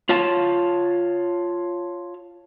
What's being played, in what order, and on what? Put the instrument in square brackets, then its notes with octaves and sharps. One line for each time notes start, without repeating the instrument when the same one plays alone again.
[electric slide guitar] F4 C#5 F5 A5